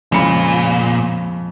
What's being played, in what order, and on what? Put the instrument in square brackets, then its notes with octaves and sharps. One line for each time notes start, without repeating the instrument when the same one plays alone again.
[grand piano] F2 G#3 C#7 [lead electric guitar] A#2 [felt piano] C#3 B5